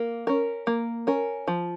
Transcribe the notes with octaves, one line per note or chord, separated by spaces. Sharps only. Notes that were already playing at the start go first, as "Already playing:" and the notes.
Already playing: A#3
C#4 A#4
A#3
C#4 A#4
F3